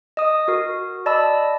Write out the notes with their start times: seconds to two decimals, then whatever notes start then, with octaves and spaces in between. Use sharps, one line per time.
0.17 D#5 D#6
0.48 F#4 A#4
1.06 D5 D#5 A5 B5 E6